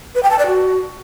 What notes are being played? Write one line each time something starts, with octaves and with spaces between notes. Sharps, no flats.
B4
G5
A5
D5
F#4